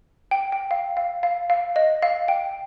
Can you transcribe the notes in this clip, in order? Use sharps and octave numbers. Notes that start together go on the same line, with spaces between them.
G5
G5
F5
F5
F5
F5
D#5
F5
G5